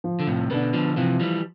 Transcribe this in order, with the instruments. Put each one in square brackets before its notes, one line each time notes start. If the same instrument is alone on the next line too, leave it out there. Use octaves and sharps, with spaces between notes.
[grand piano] F3
[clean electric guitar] D3
A2 C3
[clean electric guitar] B2 D3 [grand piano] B3 D4
[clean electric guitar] D3 F3
[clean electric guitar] C3 E3 [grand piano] F3
[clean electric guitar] E3 G3